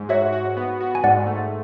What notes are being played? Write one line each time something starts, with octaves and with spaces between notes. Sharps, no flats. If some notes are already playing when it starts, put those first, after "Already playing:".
Already playing: G#2
F#4 C#5 E5
F#4
B3
F#4
G#5
G#2 D5 F#5
A3